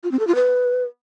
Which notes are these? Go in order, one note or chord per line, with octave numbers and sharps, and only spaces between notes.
F4
C4
A4
F4
B4